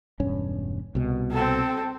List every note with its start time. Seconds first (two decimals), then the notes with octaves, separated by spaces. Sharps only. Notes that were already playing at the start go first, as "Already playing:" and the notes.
0.20 E1 G2 C#4
0.95 C2 B2
1.31 C4 A4